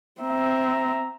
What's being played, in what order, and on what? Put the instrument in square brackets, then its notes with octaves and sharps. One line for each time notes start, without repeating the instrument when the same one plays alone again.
[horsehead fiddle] C4 E5 [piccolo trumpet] A#5